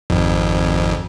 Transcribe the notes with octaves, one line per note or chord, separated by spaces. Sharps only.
G#1 F2